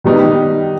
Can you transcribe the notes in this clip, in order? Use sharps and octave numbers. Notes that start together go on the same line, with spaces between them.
D#3 G3 B3 D#4